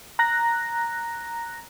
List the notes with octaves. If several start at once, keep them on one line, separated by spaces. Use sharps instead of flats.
A#5 F#6 A#6